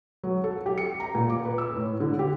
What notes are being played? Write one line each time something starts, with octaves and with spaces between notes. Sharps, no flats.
F#3
A4
G4
C#7
A#5
A#2
D6
B4
E6
A2
D3
G4